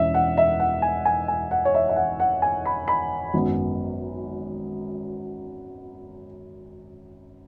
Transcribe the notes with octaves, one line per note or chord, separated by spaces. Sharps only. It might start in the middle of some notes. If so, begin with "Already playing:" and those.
Already playing: E1 E2 E3 C#4 E5
F#5
E5
F#5
G#5
G#5
G#5
F#5
C#5
E5
E5
F#5
F#5
G#5
B5
B5
G#1 F#2 F#3 B3